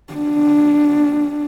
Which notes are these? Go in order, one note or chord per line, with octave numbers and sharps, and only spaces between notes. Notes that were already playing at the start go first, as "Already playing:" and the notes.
D4